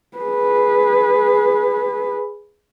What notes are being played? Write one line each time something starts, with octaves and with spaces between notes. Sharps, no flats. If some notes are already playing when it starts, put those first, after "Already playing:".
G#4 B4